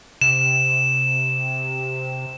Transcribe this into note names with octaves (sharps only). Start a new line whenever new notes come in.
C3 E7